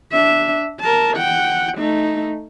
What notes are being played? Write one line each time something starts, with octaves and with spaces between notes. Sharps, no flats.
D4 E5
A#4 A5
F#5 G5
A3 D#4